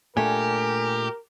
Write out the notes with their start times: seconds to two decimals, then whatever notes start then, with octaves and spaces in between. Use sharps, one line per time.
0.17 A#2 A3 D4 G4 A#4 G#5